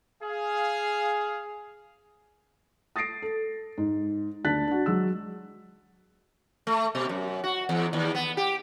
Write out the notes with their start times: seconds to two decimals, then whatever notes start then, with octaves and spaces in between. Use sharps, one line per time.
0.23 G#4 F5
2.96 D#6 A6 A#6 C7 D7
3.22 A4
3.78 G#2
4.44 D2 D4 A5 F#6 A6 B6
4.67 D4 F#4
4.86 F#3 G#3 E6
6.67 A3
6.95 B2
7.09 F#2
7.44 F#4
7.69 E2
7.93 D#2
8.15 B3
8.37 G4